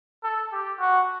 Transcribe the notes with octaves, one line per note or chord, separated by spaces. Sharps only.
A4
G4
F#4